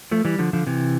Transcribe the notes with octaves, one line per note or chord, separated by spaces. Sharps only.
F3 A3
E3 G3
D3 F3
D3 F3
C3 E3